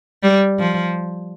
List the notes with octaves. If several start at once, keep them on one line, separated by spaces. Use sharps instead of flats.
G3
F3